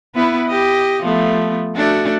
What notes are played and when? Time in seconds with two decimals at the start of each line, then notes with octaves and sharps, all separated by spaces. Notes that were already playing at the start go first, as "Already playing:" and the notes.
0.15 B3 E4 B4
0.48 G4 D#5
1.02 F3 A3 B3
1.76 A3 D4 F#4